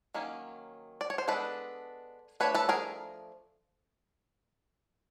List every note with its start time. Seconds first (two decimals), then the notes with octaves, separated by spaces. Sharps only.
0.14 D#3 F#3 A#3 C#4
1.01 D5
1.10 C#5
1.18 C5
1.28 G#3 B3 D4 A4 B4
2.40 F3 A3 D4 B4 C#5
2.55 A4 B4
2.69 G#4 A#4